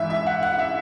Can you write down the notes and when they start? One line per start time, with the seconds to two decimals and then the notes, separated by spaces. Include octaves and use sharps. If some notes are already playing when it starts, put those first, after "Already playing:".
Already playing: G#2 E3 E5
0.10 E5
0.26 F#5
0.43 F#5
0.59 E5